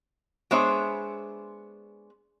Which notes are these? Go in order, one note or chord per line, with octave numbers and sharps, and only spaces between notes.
G#3 B3 D4 C5 C#5 E5